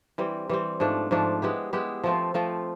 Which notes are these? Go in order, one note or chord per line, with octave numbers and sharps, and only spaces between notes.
E3 G3 C4
E3 G3 C4
G#2 F3 A3 D4
G#2 F3 A3 D4
G#3 B3 E4 G4
G#3 B3 E4 G4
F3 A3 C4 F4
F3 A3 C4 F4